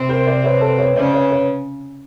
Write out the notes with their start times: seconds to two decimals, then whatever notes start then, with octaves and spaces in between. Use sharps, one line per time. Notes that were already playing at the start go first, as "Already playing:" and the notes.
Already playing: C3 C4
0.09 A#4 C5
0.26 C5 D5
0.44 B4 C#5
0.61 A4 B4
0.78 B4 C#5
0.96 C#3 C#4 C5 D5
1.13 B4 C#5
1.31 B4 C#5